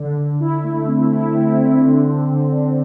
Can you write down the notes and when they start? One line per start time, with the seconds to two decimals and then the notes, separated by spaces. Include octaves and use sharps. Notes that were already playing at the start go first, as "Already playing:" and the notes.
Already playing: D3
0.18 D3
0.40 E4
0.64 A3
0.87 C4
1.11 E4
1.34 C4
1.57 C4
1.80 D3
2.04 D4
2.27 D3
2.50 D4